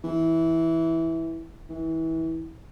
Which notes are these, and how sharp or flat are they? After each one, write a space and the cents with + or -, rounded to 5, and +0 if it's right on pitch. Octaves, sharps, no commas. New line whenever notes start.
E3 -10
E3 -25